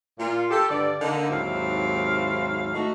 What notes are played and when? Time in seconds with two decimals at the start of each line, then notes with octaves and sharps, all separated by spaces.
0.19 A#2 F4
0.51 G4 A4
0.69 G2 D3 A4 D5
1.01 D3 A#3 D#4
1.30 D#2 G#2 F#3 C4 E4 F5
2.74 A3 D#4 F#4